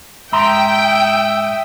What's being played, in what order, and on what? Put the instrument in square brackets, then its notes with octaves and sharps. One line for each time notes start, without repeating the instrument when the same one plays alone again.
[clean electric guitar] G#2 A#5 C6 [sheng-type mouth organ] E5 D#6 E6 [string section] G5